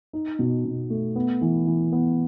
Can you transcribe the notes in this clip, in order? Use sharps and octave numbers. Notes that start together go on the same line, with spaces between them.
D#4
B2
B2
A3
B3
E3
E3
B3